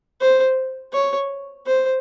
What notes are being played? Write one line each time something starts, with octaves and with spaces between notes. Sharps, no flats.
C5
C#5
C5